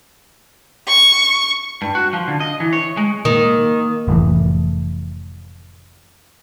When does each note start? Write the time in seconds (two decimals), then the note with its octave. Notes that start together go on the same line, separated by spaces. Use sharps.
0.88 C#6
1.82 G2
1.95 F#4
2.13 F3
2.28 D3
2.40 D#5
2.60 E3
2.73 C#5
2.97 G#3
3.25 D#3 A#3
4.08 F1 A2 E3